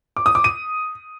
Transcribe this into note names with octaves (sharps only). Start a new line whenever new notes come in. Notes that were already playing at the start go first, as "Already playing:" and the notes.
D6
D#6
D6
D#7